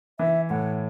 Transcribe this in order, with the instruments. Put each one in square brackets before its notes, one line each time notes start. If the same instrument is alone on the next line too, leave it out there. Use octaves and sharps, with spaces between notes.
[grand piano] E3 [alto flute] E5
[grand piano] A2 [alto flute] F#5